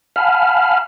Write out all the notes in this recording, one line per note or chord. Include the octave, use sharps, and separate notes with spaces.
F5 F#5 G#5 A5 B5 F6